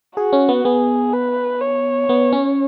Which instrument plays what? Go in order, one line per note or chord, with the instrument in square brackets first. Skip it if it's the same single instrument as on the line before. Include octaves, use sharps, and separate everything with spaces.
[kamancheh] F#4 [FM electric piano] G#4
[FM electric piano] C#4
B3
[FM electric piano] B3 [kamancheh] G#4
[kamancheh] B4
C#5
[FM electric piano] B3
C#4